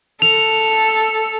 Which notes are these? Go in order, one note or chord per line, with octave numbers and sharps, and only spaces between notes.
A4 F7